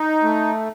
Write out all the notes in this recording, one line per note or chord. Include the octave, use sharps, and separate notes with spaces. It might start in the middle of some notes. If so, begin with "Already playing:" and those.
Already playing: D#4
A3